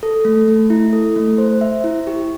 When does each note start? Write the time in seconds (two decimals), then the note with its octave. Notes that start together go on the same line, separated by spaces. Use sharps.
0.03 A4
0.25 A3
0.48 A3
0.70 E4
0.93 A4
1.16 A3
1.38 C5
1.61 E5
1.84 E4
2.07 G4